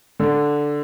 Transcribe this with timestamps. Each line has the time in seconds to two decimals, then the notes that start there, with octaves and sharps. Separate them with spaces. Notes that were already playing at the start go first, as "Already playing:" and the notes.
0.20 D3